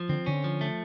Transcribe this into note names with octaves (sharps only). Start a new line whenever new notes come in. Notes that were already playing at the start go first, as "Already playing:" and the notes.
Already playing: F3
D3 C4
D3 C#4
F3
A3